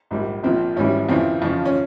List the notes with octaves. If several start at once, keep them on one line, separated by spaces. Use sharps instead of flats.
A#1 G#2 G3
A#1 A#2 F3 C4
G#1 G#2 E3 G3 C#4
F2 C#3 E3 C4
F2 C#3 F3
C#4